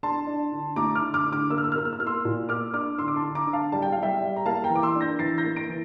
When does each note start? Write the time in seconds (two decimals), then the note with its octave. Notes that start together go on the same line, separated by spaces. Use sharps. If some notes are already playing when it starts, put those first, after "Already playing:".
0.03 D4 A5 C6
0.27 D4
0.52 D3
0.76 A3 A#5 D6
0.95 D6 F6
1.02 D3
1.14 D6 F6
1.26 D3
1.32 D6 F6
1.50 A#3 E6
1.58 F6
1.64 E6
1.72 F6
1.76 A#3 E6
1.85 F6
1.93 E6
2.00 A#3 F6
2.06 C6 E6
2.25 A#2
2.49 A#3 D6 F6
2.73 D4 D6 F6
2.98 D3 C6 E6
3.08 D6
3.16 A5 C6
3.23 D3
3.35 A#5 D6
3.47 D3
3.53 F5 A5
3.72 G3 A5
3.82 G5
3.92 G3 F5
4.03 E5 G5
4.21 G3
4.36 A#5
4.46 A#3 F5 A5
4.64 G5 A#5
4.70 E3
4.76 D6
4.83 C6 E6
4.95 D4
5.01 G6 A#6
5.19 E3 A6 C7
5.38 G6 A#6
5.44 A#3
5.56 A#6 D7
5.69 E3